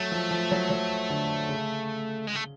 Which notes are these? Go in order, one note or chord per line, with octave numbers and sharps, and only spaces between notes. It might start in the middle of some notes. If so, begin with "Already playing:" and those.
Already playing: F#3 A3
F3
F3
F#3
F#3
D3
C#3
G#3
A3